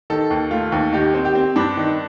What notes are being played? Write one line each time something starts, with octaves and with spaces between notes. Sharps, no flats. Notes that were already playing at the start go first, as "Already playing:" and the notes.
D#3 A4
D#2
A3 F4
D#2
D#3 G4
C4
G4
C4
G2 D4
D#3